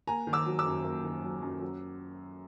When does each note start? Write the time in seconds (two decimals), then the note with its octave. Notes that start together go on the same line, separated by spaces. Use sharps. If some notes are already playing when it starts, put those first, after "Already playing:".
0.07 A#3 G#5 A#5
0.27 D#3
0.33 D6 E6
0.46 F#3
0.59 D6 E6
0.66 F#2
0.85 A#3
1.04 D#3
1.24 F#3
1.42 F#2
1.61 F#3